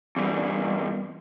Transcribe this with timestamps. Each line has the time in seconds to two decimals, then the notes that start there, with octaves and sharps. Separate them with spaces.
0.16 E2 G2